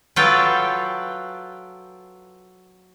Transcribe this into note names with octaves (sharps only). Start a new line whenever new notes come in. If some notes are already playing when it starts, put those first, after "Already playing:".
F#3 F4 A4 B4 F5 G5